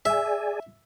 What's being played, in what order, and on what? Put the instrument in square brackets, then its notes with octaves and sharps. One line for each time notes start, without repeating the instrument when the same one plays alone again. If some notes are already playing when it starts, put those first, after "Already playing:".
[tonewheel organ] G#4 D5 G#5 [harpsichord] E5